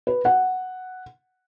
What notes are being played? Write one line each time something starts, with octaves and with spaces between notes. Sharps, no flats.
B4
F#5